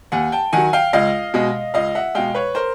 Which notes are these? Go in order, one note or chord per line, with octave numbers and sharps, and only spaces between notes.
D#2 F#5 G#5
G5 A5
D#3 F#3 F#5 G#5
F5 G5
C#2 D#5 F5
B2 G#3
C#2 D#5 F5
E5 F#5
B2 G#3 F5 G5
B4 C#5
A#4 C5